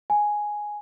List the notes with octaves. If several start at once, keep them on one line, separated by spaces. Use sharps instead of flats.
G#5